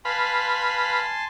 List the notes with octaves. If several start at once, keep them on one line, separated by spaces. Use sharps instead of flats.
B4 F5 G#5 A5 B5 C6